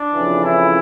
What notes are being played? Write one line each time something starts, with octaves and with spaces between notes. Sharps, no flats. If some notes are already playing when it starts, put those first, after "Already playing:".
Already playing: D4
F2 C#3 E3
E4